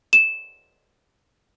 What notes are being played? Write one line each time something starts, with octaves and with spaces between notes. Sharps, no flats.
E7